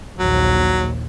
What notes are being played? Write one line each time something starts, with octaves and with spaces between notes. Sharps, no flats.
A#1 D#2 F#3